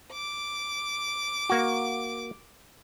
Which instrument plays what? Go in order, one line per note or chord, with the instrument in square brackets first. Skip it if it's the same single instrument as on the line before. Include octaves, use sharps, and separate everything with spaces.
[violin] D6
[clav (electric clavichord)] A#3 F#4